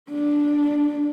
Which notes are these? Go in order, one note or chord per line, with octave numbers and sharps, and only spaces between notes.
D4